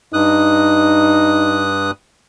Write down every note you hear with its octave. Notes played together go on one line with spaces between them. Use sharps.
G2 D#4 D#6 F#6